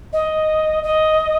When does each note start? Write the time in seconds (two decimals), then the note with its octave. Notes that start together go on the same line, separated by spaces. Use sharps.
0.13 D#5
0.83 D#5